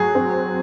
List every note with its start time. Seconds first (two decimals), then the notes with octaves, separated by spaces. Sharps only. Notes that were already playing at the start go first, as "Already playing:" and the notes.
Already playing: F#3 G#4
0.15 C4